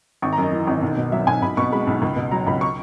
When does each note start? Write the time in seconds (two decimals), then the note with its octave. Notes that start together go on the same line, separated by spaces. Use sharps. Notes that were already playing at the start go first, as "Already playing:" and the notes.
0.22 G#1 C#6
0.33 A#5
0.38 F#2 D#5
0.53 E3
0.67 G#1
0.82 B1
0.97 B2
1.12 F#3 E5
1.27 B1 G#5
1.42 B1 B5
1.57 B2 C#6
1.72 G#3 B5
1.87 B1
2.02 C#2
2.16 B2
2.31 F#3 A#5
2.47 C#2 B5
2.61 C#6